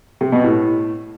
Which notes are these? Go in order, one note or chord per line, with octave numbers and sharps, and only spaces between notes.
C3
B2
A2